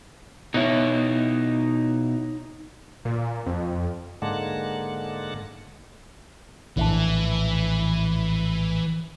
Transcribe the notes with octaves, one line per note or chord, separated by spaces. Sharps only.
B2 D#4 E4 C#5
A#2
F2
G#2 D3 G#3 A#3 F#5 A5
A#1 A2 E3 D4